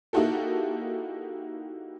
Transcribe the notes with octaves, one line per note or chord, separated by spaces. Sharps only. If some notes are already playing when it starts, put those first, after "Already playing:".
A#3 D#4 E4 F#4 G4 A4